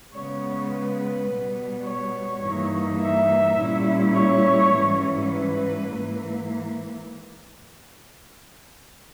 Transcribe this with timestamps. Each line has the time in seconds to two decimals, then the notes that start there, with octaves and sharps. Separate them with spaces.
0.13 C#3 G#3 B3 C#5
0.71 B4
1.27 B2 G3 B3
1.84 C#5
2.42 G2 E3 A#3 D#4
2.99 E5
3.56 A#2 G3 C#4 E4
4.14 C#5
4.71 G#2 E3 G3 C#4
5.28 B4
5.85 G#2 E3 A#3